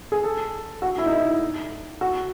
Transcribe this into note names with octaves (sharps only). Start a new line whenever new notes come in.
G#4
A4
F#4
E4
D#4
E4
F#4